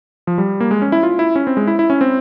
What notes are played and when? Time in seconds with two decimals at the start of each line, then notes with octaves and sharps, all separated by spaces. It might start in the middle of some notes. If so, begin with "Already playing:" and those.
0.27 F3
0.38 G3
0.60 A#3
0.71 G#3
0.82 C#4
0.92 E4
1.03 F4
1.19 E4
1.36 C#4
1.47 C4
1.57 G#3
1.67 E4
1.79 E4
1.90 C#4
2.01 C4